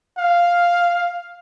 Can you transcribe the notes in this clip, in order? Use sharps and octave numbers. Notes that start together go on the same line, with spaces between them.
F5